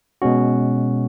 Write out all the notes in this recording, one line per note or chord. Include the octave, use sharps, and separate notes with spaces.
B2 G#3 C#4 F#4